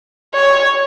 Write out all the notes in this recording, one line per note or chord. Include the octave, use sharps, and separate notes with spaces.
C#5